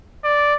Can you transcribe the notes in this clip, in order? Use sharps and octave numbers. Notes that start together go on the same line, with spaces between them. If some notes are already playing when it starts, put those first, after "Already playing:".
D5